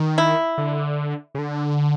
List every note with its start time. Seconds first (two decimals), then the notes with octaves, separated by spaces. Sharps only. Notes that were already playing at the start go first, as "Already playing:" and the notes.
Already playing: D#3
0.18 E4
0.58 D3
1.35 C#3
1.39 D3